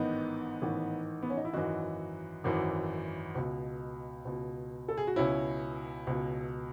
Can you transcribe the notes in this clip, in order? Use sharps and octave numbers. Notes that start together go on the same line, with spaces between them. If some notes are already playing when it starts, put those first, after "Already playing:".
Already playing: A1 G#2 D#3 B3 D#4
A1 G#2 D#3
B3
C#4
D#4
E4
G#1 F#2 E3 D#4 F#4
G#1 F#2 E3
C#2 B2
C#2 B2
A4
G#4
F#4
C#2 B2 C#4 E4
C#2 B2